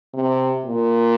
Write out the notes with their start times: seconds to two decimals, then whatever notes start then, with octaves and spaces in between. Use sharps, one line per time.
0.14 C3
0.65 A#2